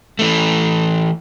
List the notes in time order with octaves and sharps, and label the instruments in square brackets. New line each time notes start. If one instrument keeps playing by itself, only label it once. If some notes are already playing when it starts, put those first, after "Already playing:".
[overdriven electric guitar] E3 A3